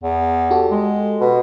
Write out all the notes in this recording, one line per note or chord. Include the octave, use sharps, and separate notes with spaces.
E2
F#4 G4 A4
G#3
B2